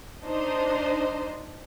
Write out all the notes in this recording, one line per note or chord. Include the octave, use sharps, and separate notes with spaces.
D4 D#4 C5 D#5